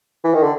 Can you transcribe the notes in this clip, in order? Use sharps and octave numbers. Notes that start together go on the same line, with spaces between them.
E3
D#3
D3